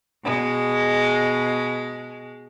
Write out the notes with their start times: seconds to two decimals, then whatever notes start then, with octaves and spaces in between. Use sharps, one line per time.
0.24 B2 G#3